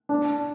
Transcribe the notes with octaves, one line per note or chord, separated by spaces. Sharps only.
D4